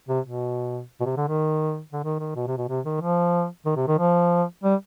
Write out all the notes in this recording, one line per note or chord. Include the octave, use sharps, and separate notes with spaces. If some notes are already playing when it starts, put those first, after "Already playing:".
C3
B2
B2
C3
D3
D#3
D3
D#3
D#3
B2
C3
B2
C3
D#3
F3
D#3
C3
D#3
F3
G3